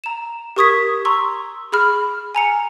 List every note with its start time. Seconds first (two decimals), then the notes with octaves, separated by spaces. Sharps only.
0.04 A#5 E7
0.56 G4 A#4 C#6 D#6 G#6 B6
1.05 A#5 C6 C#6 E6
1.72 G#4 B5 F6
2.35 G#5 A#5 C#7